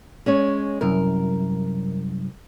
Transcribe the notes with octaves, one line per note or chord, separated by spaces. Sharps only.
G#3 C#4 C#5
C2 F#2 A#4